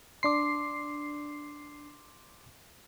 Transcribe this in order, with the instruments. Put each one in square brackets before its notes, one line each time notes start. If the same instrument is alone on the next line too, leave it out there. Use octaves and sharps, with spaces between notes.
[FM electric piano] D4 C7 [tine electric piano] C6 D6